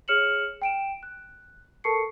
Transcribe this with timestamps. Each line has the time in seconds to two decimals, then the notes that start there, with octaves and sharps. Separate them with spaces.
0.08 G#4 C#5 F6 C#7 E7 F#7
0.62 G5 D7 E7
1.03 F#6
1.84 A4 A#4 A5 C#6 C7 C#7